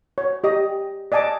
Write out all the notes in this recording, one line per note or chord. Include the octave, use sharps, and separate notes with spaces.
C#5
G4 D#5
D5 D#5 G#5 A5 D6